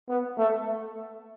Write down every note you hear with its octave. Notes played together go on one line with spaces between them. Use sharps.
B3
A3